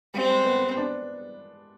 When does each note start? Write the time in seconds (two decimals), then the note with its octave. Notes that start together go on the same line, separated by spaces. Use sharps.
0.14 G3 C4
0.30 G#3
0.45 B3
0.56 B3
0.77 D4